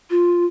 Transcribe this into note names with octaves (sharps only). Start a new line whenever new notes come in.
F4